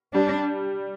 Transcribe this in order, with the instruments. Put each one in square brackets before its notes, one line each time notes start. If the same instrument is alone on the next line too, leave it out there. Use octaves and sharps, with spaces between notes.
[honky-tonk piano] G3 [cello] D4